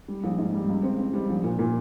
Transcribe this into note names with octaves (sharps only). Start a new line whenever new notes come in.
G3
A#1
G#2
G3
C#2
C4
C4
G3
A#1
A#2
A#2